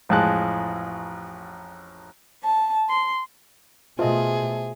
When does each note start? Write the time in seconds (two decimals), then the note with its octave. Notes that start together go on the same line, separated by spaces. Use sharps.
0.09 A1 F2 A2 G#3 A5 F#6
2.43 A5
2.88 C6
3.99 B2 A3 F4 G#4 C5 D#5 E5 A5